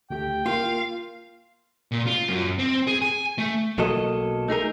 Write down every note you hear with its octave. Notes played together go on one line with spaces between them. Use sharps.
D2 A3 G4 G5
A#3 F4 A#4 F5
A#2
F4
F#2
C4
G#4
G#5
A3
B1 F#3 A#3 A4 D#5
A3 D#4 G#4 A#4